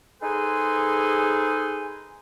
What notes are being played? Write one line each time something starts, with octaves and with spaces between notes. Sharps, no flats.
D#4 G#4 A4 B4 C5 G#5